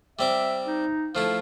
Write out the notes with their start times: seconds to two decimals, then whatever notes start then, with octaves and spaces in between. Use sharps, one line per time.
0.19 G3 C4 E5 D6
0.66 D#4
1.15 F3 A3 E4 F5